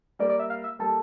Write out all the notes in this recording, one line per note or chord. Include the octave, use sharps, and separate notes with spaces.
G3 A#3 D5
D5
E5
F5
E5
G3 A#3 A4